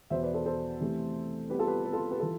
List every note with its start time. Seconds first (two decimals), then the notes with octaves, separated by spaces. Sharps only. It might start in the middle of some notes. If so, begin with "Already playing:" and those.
0.10 E2 B2 B3 C5 E5
0.23 B4 D5
0.34 A4 C5
0.46 A4 C5
0.80 C3 E3 A3
1.50 C3 G3 B3 G4 B4
1.59 F4 A4
1.67 G4 B4
1.84 G4 B4
1.93 F4 A4
2.11 G4 B4
2.20 E3 F4 A4